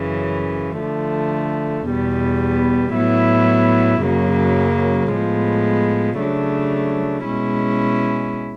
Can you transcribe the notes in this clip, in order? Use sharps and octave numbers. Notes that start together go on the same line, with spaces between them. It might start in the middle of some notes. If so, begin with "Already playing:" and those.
Already playing: F#2 C#3 E3
D3 F3 A3
E2 B2 G3 B3
A2 F#3 B3 E4
F#2 C#3 F#3 A#3
A2 F3 G#3 B3
C#3 F#3 A3 D4
B2 G#3 C#4 E4